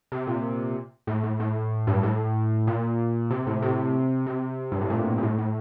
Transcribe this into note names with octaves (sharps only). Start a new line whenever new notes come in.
C3
A#2
A2
A2
A2
G2
A2
A#2
C3
A2
C3
C3
G2
A2
A#2
A#2
A2
A2